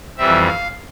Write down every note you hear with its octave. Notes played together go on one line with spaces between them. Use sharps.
F2 E3 G3 C4 E5
F5